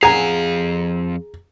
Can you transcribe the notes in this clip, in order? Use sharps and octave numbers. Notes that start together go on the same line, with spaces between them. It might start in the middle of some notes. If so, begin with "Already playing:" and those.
F2 G#4 F5 F#5 G#5 A#5